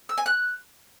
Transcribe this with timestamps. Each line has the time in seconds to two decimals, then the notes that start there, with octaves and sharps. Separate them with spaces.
0.09 E6
0.18 G#5
0.26 F#6